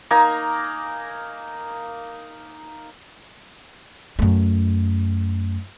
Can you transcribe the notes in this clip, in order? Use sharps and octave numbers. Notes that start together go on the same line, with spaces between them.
A#3 D#4 G#5 A#5
F#2 A3